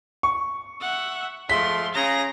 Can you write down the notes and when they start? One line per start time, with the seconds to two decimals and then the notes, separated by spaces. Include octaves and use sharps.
0.23 C#6
0.81 E5 F#5
1.49 F3 G#3 A3 C6 B6
1.94 C#3 G#4 A#5 A#6